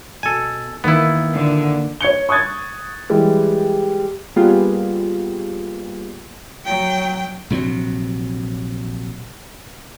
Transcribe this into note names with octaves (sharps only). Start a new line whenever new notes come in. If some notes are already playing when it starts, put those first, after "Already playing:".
B2 A4 G#5
D#3 A#3 B3 E4
A#2 D3
C#5 G#6 C#7 G7
C#6 D#6 F#6 G#6 A6
E3 G3 G#3 G4
G3 A#3 B3 F4 G4 G#4
F#3 G5
A#1 C3 F3 F#3